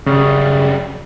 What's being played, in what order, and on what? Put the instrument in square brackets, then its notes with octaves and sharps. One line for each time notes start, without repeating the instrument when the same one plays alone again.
[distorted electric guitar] F#2 G3 [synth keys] C#3